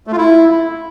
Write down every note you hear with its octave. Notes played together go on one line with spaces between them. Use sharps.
A3
F4
E4